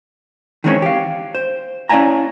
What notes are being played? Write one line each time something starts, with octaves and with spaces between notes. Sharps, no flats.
D#3 E3 G#3 C4 C#4 C#5
G4 F5
C5
C#4 E4 D5 F5 G#5 A#5